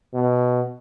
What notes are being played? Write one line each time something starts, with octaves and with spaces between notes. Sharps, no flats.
B2